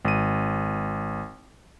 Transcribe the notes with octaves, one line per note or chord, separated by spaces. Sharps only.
G#1 D#7